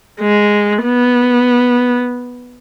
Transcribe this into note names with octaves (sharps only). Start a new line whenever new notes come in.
G#3
B3